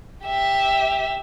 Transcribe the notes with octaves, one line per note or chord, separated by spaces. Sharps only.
G4 E5